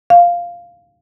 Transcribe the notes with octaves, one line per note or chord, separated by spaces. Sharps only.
F5